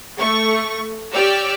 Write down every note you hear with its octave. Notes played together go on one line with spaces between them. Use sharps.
A3 C#6
G4 C#5 D5 E6 F6